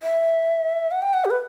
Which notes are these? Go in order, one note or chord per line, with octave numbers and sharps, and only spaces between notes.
E5
F#5
G5
F#5
G4
B4